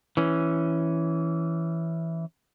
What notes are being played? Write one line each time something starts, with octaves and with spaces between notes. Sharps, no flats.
E3 C#4